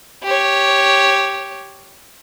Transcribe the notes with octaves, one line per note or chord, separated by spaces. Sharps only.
G4 C#5